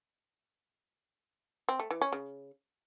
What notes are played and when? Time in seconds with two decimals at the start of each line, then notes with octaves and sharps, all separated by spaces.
1.69 C4
1.80 A3
1.91 E3
2.01 C#4
2.12 C#3